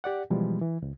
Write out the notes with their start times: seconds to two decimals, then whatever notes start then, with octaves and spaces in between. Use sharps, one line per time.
0.04 G4 D5 F#5
0.30 B2 E3 F3 G3 G#3
0.61 E3
0.82 C#2